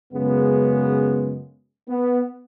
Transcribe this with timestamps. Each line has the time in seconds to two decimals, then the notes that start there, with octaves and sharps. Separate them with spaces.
0.13 F#2 C#3 G#3 B3
1.89 B3